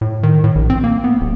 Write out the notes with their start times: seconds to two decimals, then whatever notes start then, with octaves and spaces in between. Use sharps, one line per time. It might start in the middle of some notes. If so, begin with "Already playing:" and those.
0.01 A2
0.23 D#3
0.44 A2
0.55 A#1
0.70 C4
0.84 A#3
1.04 B3
1.21 D1